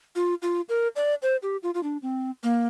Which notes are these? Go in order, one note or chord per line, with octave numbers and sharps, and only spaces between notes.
F4
F4
A#4
D5
C5
G4
F4
F4
D4
C4
A#3